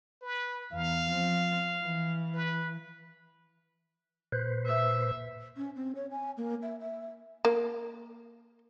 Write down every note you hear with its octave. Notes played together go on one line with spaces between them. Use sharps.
B4
E2 F5
F3 C4
E3
B4
A#2 B4 C5
E5
C#4
C4
C#5
G#5
A#3
E5
E5
A#3